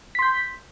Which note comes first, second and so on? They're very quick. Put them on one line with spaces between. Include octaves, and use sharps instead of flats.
B6 C6 G6